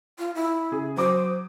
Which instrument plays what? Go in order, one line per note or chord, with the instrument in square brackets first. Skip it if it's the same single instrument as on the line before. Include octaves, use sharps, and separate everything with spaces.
[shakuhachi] F4
E4
[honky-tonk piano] C#3 G#4
[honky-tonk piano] F#3 D6 D#6 [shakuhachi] C5